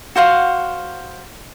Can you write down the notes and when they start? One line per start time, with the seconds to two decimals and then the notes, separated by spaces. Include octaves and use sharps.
0.16 F#4 C5 F5 F#5